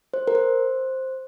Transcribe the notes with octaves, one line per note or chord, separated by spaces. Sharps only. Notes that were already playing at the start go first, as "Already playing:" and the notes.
C5
A#4
C5